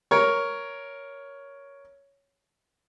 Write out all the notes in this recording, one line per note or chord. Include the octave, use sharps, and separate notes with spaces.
A#4 C#5